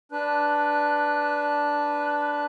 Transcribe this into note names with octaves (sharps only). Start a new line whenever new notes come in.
D4 B4